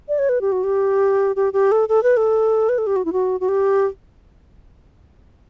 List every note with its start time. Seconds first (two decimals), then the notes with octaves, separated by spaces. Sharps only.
0.08 D5
0.19 C#5
0.29 B4
0.41 G4
0.52 F#4
0.64 G4
1.36 G4
1.53 G4
1.72 A4
1.89 A4
2.03 B4
2.17 A4
2.69 B4
2.78 A4
2.87 G4
2.96 F#4
3.05 E4
3.13 F#4
3.40 F#4
3.49 G4